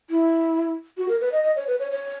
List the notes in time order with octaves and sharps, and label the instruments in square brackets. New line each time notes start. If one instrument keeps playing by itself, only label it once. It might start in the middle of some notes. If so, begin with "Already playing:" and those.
[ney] E4
F#4
A#4
B4
D#5
D#5
C#5
B4
C#5
C#5